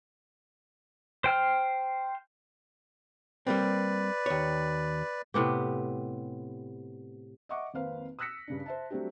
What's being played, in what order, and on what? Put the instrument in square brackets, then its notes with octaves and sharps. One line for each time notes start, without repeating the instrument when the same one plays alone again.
[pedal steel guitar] C5 G5 F6
[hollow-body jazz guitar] G3 A#3 C4 [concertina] B4 D5
[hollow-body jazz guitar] D#2 C#5
[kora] A2 C3 B3 G4
[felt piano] D#5 E5 F#5 C#6 D6
G#1 F2 A#3 B4 C5 F5
D#6 E6 F#6 A#6 B6 C#7
G2 C#3 D4
C5 E5 A5
F#3 G3 A3 C4 D4 G4